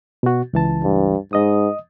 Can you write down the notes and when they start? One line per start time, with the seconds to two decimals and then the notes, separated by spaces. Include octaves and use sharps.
0.23 B2 F#4
0.53 C#2 E3 A5
0.84 G2
1.33 G#2 D#5 D#6